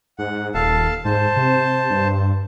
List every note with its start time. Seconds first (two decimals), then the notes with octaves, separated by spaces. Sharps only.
0.19 G#2 F#5
0.54 D#1 A4 F5 A5
1.05 G#2 C5 A5
1.36 C3
1.90 G2